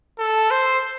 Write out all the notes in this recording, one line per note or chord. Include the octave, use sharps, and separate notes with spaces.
A4
C5